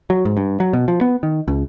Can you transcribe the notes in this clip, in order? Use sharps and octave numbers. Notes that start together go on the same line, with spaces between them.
F#3
G#2
G2
F#3
B2
F3
B3
D#3
C#2